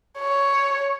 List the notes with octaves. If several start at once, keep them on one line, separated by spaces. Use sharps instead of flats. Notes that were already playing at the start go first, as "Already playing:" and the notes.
C#5